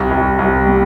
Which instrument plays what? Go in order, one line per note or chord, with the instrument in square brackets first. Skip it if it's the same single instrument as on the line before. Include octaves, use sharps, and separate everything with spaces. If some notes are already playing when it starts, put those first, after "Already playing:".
Already playing: [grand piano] C2
C2
C2
G3